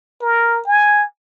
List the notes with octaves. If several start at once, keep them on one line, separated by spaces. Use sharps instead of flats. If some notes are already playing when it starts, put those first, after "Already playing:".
A#4
G#5